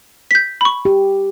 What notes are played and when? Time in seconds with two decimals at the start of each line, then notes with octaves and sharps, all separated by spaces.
0.31 G6 B6
0.61 B5 C#6
0.85 G4